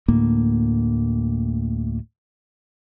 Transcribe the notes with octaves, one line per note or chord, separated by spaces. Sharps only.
D2 A2 A#3